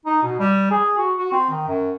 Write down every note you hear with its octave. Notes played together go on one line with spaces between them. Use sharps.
D#4
B2
G3
G#4
F#4
F#4
C4
D#3
F#2